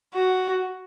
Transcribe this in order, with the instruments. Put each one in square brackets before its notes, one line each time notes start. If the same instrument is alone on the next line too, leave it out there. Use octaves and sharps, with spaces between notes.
[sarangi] F#4